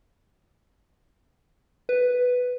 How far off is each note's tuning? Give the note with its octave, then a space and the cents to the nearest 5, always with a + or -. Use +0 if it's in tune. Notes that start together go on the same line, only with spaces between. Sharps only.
B4 +5